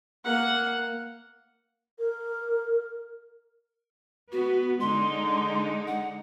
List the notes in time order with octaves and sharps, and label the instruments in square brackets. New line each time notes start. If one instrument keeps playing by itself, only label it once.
[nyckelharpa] A#3 F#5
[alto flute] A#4
[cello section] B3 [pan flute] F#4
[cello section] D3 G#3 D#4 [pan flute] C6
[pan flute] F#5